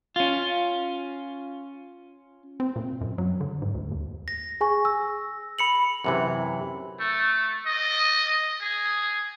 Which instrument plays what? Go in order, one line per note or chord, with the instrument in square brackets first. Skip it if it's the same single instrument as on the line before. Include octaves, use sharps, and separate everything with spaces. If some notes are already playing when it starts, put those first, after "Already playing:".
[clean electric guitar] C#4 F4
[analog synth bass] C4
A#2
F#2
F#3
D3
G#2
D2
D#2
[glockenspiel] A#6
[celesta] G#4 G#5 C#6
E6
[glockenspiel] B5 C#7 F#7
[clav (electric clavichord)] F#2 C3 E3
[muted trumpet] A3
D#5
G#4